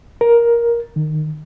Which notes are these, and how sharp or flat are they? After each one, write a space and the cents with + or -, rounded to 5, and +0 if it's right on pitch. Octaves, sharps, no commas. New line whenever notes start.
A#4 +10
D#3 -20